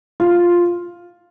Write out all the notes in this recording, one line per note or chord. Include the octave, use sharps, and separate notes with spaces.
F4